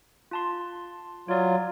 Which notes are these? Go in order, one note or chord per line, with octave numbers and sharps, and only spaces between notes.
F4 A5 C6
F#3 F4 C#5 D5